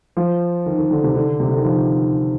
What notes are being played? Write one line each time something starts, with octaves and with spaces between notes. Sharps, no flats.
F3
D#3
D#3
D3
C3
D3
C3
D3
D#3
F3